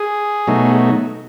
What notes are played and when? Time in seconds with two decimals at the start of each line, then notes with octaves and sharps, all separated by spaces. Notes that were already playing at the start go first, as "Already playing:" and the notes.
Already playing: G#4
0.47 B2 F#3 A3 D#4